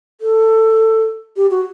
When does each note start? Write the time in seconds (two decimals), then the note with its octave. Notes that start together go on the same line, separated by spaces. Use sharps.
0.21 A4
1.36 G4
1.51 F#4